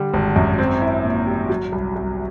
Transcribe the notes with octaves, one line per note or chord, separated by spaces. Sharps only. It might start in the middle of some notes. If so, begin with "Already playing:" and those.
Already playing: D3 G3
G#1
F#2
C4
E4
A#2
G3
F#3
C2
C2